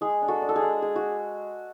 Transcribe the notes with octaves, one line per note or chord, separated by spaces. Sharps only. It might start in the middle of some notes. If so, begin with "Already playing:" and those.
G#3 G#4
D4
F#4 A4
D4
A4
G#4
G#3
G#3 G#4
F#4